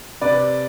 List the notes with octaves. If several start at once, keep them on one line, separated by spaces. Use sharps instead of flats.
C3 B4 D5